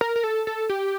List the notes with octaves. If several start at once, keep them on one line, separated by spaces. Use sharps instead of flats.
A#4
A#4
A4
A4
G4